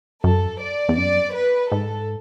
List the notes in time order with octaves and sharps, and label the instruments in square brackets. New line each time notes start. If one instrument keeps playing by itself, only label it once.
[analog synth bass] F#2 [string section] A4
[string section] D5
[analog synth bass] E2
[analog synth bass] F#2 [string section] D5
[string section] B4
[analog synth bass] G#2 [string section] A4